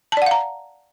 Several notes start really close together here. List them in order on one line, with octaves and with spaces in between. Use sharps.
A5 D5 F#5 F5 A#5